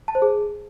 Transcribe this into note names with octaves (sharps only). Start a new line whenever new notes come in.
A5
C5
G#4